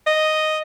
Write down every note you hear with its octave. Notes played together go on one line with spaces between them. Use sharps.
D#5